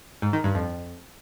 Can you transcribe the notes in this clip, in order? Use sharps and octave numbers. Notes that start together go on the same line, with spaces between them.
G#2
D#3
G2
F2